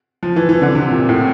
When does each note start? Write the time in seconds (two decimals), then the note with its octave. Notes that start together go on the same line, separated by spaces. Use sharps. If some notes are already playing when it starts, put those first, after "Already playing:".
0.23 F3
0.36 E3
0.49 E3
0.62 D3
0.75 C3
0.91 A#2
1.09 A2